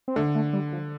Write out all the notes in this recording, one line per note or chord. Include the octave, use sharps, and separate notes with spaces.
C4
D3 A3
A3
G3
F3